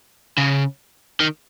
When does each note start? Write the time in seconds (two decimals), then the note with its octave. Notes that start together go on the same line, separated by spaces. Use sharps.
0.38 C#3
1.20 D#3